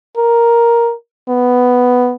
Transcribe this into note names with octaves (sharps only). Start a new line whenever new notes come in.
A#4
B3